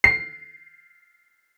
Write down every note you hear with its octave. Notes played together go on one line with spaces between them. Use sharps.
C7